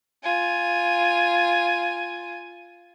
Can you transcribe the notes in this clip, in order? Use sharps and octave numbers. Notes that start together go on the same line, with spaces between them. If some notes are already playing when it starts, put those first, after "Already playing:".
F4 G#5